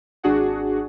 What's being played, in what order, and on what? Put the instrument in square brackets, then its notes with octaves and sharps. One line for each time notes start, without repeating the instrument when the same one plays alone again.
[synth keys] G#1 D4 F#4 G#4 F#5